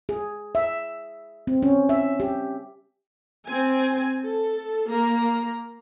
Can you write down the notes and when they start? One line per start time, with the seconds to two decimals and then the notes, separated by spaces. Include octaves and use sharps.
0.09 G#4
0.55 E5
1.47 C4
1.63 C#4
1.89 E5
2.20 G4
3.47 C4 G#5
4.23 A4
4.89 A#3 A#5